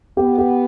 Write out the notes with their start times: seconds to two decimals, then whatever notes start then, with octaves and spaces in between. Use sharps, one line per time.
0.17 B3 G4
0.38 G4